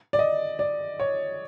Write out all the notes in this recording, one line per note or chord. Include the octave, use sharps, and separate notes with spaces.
D5
D#5
D5
C#5